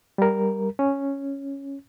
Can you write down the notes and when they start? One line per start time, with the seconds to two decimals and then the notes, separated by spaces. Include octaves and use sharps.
0.18 G3 A#4
0.79 C#4